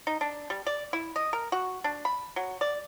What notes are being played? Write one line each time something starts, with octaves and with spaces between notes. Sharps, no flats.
D#4
D4
G3
D5
E4
D#5
A#4
F#4
D4
B5
F#3
D5